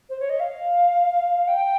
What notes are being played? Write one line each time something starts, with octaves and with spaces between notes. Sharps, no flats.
C5
C#5
D#5
F5
G5